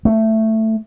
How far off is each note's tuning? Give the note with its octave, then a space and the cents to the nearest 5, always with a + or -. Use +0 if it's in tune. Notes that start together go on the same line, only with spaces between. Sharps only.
A3 +10